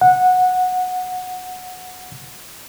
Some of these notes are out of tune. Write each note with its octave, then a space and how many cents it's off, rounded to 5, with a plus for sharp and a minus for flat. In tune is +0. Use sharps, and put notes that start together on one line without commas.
F#5 -15